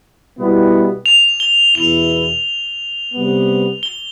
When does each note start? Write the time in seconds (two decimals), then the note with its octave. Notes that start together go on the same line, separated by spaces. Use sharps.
0.37 B2 G3 B3 E4
1.06 F7
1.40 G7
1.75 E2 B2 B3 E4 F7
3.14 C3 G3 B3
3.83 G7